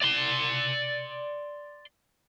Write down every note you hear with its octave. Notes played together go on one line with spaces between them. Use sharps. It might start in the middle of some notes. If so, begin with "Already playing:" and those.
D5 C6